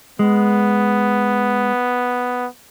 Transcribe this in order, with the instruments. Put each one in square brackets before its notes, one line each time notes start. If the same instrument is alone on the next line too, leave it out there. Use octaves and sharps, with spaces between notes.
[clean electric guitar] G#3 [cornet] B3